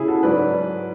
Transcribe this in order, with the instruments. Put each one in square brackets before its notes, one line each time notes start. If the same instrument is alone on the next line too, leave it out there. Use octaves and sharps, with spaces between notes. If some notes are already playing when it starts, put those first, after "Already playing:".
Already playing: [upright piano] C#3 E4 G#4
F#4 A4
G#2 F#3 B4 D5